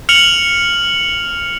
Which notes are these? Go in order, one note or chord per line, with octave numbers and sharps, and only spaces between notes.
F6 C#7 F7 F#7